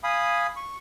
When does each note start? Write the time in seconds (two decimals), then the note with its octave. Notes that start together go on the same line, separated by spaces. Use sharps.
0.03 F5 G#5 B5 D#6
0.56 C#6